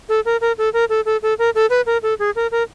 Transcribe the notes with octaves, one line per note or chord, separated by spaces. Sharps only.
A4
A#4
A#4
A4
A#4
A4
A4
A4
A#4
A4
B4
A#4
A4
G#4
A#4
A#4